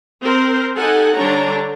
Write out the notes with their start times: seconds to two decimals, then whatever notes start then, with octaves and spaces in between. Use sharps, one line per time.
0.22 C4 A#4 C5
0.77 D#4 G4 A4 F#5 G#5
1.15 D3 G3 D4 C#5 A#5